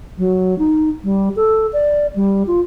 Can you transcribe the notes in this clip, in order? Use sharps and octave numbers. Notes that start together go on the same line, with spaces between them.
F#3
D#4
G3
A4
D5
G3
F4